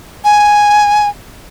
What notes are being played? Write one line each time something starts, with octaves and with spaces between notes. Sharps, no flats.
G#5